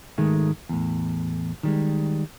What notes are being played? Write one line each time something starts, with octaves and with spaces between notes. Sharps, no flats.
G#2 D#3 G#3 A3
E2 A2
D#3 G3 G#3